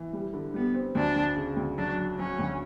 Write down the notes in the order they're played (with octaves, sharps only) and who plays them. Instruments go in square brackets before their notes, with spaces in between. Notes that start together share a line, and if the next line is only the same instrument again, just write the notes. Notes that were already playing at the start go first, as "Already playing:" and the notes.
Already playing: [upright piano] E3
G3
D3
[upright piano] G3 [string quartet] B3
[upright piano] C4
[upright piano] D2 [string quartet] D4
[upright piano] D2
C#3
D2
[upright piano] F#3 [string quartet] D4
[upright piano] F#3
[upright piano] F#3 [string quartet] C#4
[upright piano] D2